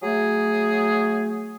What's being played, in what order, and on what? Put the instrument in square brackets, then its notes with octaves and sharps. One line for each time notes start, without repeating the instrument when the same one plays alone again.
[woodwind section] F#3 A3 G#4